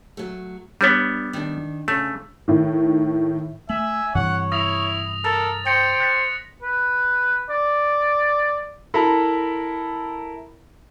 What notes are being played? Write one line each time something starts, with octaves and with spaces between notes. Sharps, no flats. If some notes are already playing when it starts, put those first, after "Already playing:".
F#3 A3
G3 B3 D4 C#5
D#3 D4
C#3 A3
A2 D#3
A3 E5 G#5 F#7
G2 C3 E3 C#5 F#5
E4 D#6 A#6 F7
A4 A#4 A6
C5 G5 A#6 C#7 F#7
F#6 A6 B6
B4
D5
E4 A4 A#4 A#5 B5